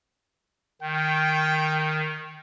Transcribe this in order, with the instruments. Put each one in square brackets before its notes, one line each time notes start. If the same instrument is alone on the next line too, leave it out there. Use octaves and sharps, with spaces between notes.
[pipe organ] D#3 [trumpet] G5